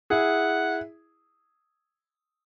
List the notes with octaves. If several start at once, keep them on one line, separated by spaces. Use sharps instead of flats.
E4 G#4 F#5